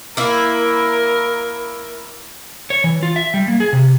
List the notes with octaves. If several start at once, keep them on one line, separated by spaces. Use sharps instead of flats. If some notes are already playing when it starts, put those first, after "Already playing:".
A#3 E4 A#4
C#5
E3
F4
E5
G3
A#3
G#4
C3